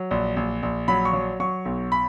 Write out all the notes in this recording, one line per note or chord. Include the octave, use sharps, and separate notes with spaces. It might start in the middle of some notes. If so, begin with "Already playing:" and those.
Already playing: F#3
A#1
A#1
A#1
F#3 B5
C#6
F#3
F#3 C#6
B1
B5